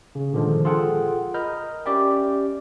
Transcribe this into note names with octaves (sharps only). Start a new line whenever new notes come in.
C#3
A#2 D3 D#3 F3 G#3
F4 G#4 A4 F#5 G5
A#4 D#5 B5 F6 G6
C#4 G4 D5 E5 G5